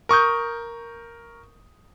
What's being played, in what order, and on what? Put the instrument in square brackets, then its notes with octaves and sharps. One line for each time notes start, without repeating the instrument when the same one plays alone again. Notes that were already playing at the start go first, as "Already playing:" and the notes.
[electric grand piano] A#4 C#6 D#6 G6